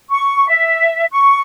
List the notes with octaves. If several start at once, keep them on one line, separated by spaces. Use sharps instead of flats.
C#6
E5
C#6